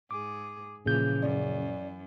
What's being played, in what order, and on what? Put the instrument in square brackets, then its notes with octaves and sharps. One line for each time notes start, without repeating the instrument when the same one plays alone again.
[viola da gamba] G#2 G#4 [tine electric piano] D6
[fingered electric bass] A#2 [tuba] C#3 [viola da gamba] E3 F3 A#3 [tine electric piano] G#4 G6
[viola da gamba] F#2 [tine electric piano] D5